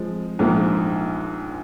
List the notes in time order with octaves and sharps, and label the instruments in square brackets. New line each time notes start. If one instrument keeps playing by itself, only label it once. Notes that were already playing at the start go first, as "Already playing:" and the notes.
Already playing: [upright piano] F3 G#3 C4
A#1 G#2 F3 A#3